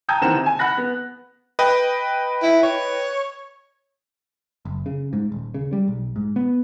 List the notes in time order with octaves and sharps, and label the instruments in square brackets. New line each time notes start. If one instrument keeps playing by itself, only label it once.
[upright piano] G5 A5 A#5 D#6 G6 G#6
D#2 E3 C4 F#5 A#5 E7
C3
G#5
F#5 B5 F#6 A#6
B3
[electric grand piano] B4 D#5 G5
[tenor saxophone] E4
C#5
[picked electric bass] F#1
C#3
G#2
D#1
C#3
G3
B1
G#2
B3